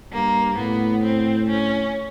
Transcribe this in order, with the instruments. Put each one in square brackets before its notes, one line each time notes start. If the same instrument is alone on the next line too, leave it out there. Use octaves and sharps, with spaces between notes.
[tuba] G2 [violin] A#3
[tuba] A2 [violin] B3
[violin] C4
C#4